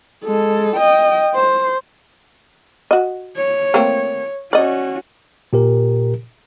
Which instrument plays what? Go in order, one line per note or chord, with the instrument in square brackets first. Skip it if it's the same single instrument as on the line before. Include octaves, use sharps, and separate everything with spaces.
[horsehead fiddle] G#3 A4
D#5 G5
C5
[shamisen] F#4 D#5
[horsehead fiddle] C#5
[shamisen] A3 A#3 C4
[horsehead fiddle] C#4 F#4 [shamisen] D5 D#5
[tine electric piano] A#2 G4 A#4